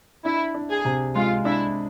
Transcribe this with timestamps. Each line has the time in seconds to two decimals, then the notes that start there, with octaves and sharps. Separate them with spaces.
0.24 D4 E4
0.54 D4
0.70 G#4
0.85 C3
1.15 G#3 F4
1.45 D4 E4